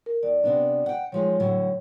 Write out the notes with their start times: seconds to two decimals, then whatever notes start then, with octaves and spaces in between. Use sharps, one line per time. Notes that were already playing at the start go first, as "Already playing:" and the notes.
0.06 A#4
0.23 D#2 D5
0.44 C3 B3 D4
0.86 F#5 G5
1.12 D#3 F3 G#3 C#5
1.40 A2 D3 F#3